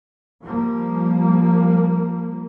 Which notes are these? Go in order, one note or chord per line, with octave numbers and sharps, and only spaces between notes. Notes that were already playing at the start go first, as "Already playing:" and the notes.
F3 G3 A#3